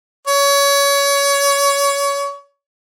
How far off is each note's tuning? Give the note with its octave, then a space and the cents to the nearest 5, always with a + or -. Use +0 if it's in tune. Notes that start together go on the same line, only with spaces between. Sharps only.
C#5 +25